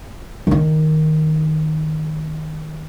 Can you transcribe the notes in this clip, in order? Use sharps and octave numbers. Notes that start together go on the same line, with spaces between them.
D#3 D#4